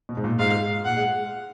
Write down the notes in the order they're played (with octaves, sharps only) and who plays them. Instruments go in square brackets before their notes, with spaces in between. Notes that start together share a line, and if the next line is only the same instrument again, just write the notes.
[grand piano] B2
G#2
A#2
[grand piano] G#2 [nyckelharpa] F5
[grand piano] A#2 [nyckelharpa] F#5
[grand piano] G#3